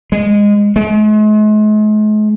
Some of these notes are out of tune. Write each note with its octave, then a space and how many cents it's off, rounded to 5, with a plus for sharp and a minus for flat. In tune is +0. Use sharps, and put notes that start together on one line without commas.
G#3 -15
G#3 +45